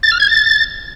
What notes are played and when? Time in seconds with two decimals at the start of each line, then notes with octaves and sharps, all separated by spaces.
0.03 A6
0.12 F6
0.20 G#6
0.28 A6